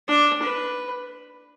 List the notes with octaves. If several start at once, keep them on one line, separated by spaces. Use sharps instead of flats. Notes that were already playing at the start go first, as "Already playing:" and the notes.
D4
B4